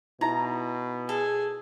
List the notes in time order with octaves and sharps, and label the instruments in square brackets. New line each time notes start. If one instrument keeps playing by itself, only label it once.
[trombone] B2 [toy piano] D#4 E4 E5 [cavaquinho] A#5
[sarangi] G#4 [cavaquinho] A4